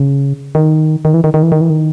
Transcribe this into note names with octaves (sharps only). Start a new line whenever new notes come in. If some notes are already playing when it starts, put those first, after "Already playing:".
Already playing: C#3
D#3
D#3
E3
D#3
D#3
E3
D#3
E3
D#3